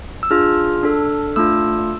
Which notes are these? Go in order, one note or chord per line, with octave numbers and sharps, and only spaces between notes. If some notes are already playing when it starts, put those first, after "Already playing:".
E6
D4 F4 G#4 F6
D4 A4
A3 D4 F4 E6